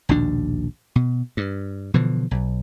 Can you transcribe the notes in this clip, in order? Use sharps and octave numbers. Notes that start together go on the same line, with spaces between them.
A#1 D#2 B2 D4
B2
G2
B2 D3 E3 F3
B1